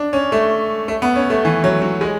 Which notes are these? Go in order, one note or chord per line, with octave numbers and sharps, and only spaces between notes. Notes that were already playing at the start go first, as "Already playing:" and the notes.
Already playing: D4
C#4
A3
A3
B3
C#4
A3
E3
F#3
F#3
G#3